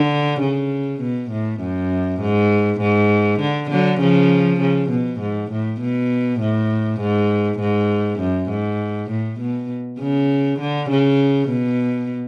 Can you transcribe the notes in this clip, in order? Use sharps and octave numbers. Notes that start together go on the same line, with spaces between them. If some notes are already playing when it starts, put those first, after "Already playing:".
Already playing: D3
C#3
B2
A2
F#2
G#2
G#2
D3
D3 F#3
C#3 F3
C#3
B2
G#2
A2
B2
A2
G#2
G#2
F#2
G#2
A2
B2
C#3
D3
C#3
B2